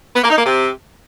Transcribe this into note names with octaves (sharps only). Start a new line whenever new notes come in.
B3
A#3
D#4
A#3
C3